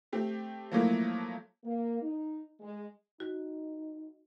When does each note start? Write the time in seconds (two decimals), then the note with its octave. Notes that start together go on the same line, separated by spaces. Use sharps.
0.13 A3 C4 G4
0.72 F3 F#3 A3 A#3 E4
1.64 A#3
2.02 D#4
2.60 G#3
3.20 D#4 F#4